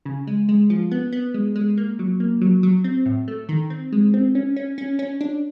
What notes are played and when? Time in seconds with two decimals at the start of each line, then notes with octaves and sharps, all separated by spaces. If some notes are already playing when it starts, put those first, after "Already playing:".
0.05 C#3
0.27 G#3
0.49 G#3
0.70 F3
0.92 B3
1.13 B3
1.34 G#3
1.56 G#3
1.77 A#3
1.99 F#3
2.20 A#3
2.42 F#3
2.63 F#3
2.84 C4
3.06 A2
3.28 A3
3.49 D#3
3.70 C4
3.92 G#3
4.14 C4
4.35 C#4
4.56 C#4
4.78 C#4
4.99 C#4
5.21 D4